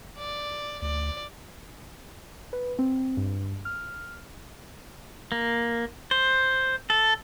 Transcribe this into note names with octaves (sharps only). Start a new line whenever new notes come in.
D5
D2 D5
B4
C4
G2
F6
A#3
C5
A4